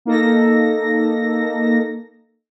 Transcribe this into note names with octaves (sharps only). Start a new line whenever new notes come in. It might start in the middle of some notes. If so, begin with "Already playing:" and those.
A#3 D#4 A4 A#6